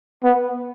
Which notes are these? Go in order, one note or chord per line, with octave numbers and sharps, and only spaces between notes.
B3